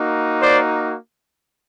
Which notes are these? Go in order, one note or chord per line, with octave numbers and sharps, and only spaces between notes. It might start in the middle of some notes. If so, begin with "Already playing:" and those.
Already playing: A#3 D#4 F#4
C5 D5